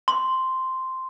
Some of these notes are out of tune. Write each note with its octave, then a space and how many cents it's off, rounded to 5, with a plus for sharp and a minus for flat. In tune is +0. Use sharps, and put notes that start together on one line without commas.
C6 -5